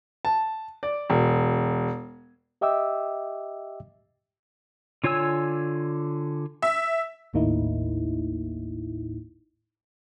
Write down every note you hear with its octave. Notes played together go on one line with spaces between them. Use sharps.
A5
D5
E1
G4 D#5 E5 G5 D6 E6
D3 F4 C#5 G#5 E6
E5
G#1 D#2 A2 A#3 D#4 E4